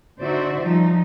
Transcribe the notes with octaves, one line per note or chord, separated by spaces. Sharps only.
D3 D#4 F#4 C5 D5 E5
F3 G3 D#4